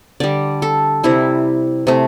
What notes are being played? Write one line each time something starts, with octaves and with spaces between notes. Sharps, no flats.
D3 G3 D5
A4
C3 G3 E4
C3 A3